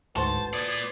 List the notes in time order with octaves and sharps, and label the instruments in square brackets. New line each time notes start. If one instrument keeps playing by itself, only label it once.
[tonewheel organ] D2 G#2 [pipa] F#4 A4 C5 [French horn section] B4 [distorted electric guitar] A5
[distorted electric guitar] A#2 D5 [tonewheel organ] D#6 G#6